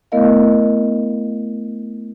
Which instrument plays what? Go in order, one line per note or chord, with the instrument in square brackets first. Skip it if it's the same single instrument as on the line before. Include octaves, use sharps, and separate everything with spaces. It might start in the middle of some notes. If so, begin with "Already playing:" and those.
[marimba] A3 B3 E4 A#4 D#5 F5